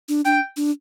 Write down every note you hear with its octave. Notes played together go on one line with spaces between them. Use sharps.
D4
D4 G5
D4